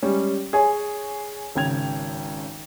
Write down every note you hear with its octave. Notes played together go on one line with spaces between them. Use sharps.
G3 G#3 C#4
G#4 C#5 G#5
G#1 C#3 G5 G#6 F7